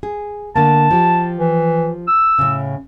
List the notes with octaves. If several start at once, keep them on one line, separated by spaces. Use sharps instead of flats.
G#4
D3 A3 A#3 A5
F3 G4
E3
E6
A2 C#3